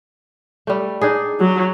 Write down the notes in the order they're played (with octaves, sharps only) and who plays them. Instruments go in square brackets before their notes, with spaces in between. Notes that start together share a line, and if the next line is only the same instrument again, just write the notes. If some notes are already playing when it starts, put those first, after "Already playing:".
[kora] G3 A3
D4 D#4 G#4
[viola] F#3